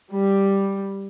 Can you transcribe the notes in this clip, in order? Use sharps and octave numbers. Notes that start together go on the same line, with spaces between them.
G3